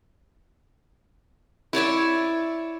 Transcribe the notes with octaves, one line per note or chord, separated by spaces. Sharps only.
E4 C#5 D5 E5